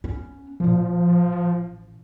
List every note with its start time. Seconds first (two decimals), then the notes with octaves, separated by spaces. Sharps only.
0.04 B3 C#4
0.60 A1 A#2 F3